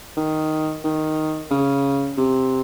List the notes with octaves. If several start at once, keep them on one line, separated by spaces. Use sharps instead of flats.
D#3
D#3
C#3
C3